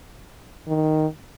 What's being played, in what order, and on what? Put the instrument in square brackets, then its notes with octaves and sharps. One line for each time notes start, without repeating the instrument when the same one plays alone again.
[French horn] D#3